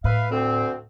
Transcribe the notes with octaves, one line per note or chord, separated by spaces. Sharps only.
A2 B4 E5 F5
D2 C4